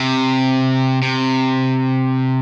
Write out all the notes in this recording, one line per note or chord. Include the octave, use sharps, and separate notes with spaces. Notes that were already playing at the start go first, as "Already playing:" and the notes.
Already playing: C3
C3